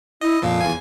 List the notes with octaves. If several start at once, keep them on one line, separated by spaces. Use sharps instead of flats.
E4 D#5
F2 A#2 F3 F5
E2 G#5